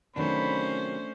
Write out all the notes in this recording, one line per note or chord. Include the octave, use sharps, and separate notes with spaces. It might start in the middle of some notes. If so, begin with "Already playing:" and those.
C3 D#3 F#3 A3 C#4 D4 C5 B5